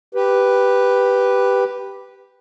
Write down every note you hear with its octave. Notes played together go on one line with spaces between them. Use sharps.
G4 B4